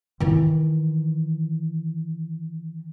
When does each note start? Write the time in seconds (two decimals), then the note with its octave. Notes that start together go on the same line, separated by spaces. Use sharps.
0.20 D#3 E3